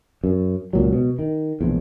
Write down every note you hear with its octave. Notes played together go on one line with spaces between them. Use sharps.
F#2
C#2 A#2 F#3
B2
D#3
E1 A#1 E2